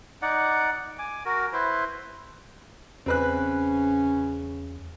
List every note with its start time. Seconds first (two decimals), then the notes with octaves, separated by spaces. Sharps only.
0.22 D#4 D5 F#5
0.99 G#5 D6
1.25 F#4 A#4
1.53 E4 B4 C5
3.06 E2 C#3 C4 C#4 B4 F#6